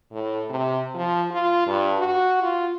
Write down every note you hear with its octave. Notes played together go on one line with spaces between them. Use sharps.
A2
C3
F3
F4
G2
F#4
F4